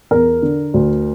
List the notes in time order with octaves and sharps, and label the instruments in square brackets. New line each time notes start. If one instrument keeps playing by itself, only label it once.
[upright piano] E2 A#4
D3
D2